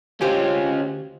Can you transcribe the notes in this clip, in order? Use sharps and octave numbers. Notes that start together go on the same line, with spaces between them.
D2 C#4 F4 G4 C5